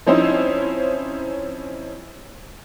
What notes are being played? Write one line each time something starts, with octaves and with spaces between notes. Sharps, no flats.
F3 C4 C#4 D#4 E4 C5